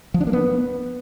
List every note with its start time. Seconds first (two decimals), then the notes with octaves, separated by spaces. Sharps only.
0.14 F3
0.21 D4
0.27 A#3
0.33 B3